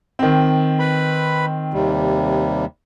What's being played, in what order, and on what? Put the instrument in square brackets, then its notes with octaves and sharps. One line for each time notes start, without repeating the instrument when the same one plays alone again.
[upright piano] D#3 C4
[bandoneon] B4 B5
D#2 C3 G3